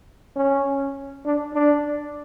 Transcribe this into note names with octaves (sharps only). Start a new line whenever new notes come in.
C#4
D4
D4